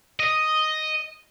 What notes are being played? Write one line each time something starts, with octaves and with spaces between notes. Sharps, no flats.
D#5